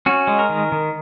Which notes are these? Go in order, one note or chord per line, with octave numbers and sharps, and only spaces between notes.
C#4 F#4
G#3
A#4
D#3
D#3